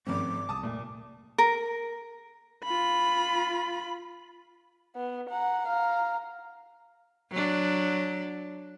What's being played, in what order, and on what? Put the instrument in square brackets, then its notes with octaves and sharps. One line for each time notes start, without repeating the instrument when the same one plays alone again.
[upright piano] G#1 C#3 C#4 [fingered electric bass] F3 A3 C4 [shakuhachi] D6
[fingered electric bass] C2 [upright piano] A5 D#6
[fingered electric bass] F1 A3 A#3 [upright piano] A#2
[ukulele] A#4
[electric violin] F4 B5
[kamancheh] B3
F#5 A#5
F5 A#5
[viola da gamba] F#3 D4